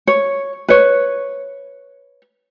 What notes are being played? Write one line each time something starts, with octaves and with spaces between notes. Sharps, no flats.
C#5
B4 C#5